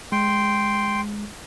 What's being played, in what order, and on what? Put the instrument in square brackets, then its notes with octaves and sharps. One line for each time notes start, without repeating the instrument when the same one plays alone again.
[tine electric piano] G#3 [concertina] G5 C6